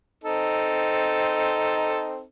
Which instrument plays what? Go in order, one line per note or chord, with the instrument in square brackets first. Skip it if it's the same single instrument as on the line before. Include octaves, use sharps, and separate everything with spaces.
[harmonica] C4 D#4 A4